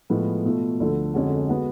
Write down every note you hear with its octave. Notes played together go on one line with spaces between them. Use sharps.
A2 F3 G#3 B3
B2 A3 F4
D2 D3 F3 A3
F2 D3 G#3 C#4 F#4
G#3 B3 F#4